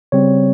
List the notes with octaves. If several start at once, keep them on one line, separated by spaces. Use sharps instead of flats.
C#3 G3 C4 C#5